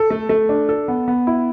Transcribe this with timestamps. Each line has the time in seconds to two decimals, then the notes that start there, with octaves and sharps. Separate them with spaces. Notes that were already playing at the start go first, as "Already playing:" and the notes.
Already playing: A4
0.10 A3
0.29 A3
0.49 D4
0.69 A4
0.88 B3
1.08 B3
1.27 E4